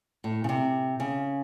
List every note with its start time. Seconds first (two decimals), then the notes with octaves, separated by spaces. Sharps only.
0.24 A2
0.44 C#3
0.49 C3
1.00 C#3